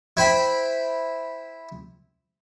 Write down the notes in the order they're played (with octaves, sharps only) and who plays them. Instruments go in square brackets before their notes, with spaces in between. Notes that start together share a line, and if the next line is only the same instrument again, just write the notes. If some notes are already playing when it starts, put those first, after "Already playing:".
[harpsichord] E4 C5 G5 B5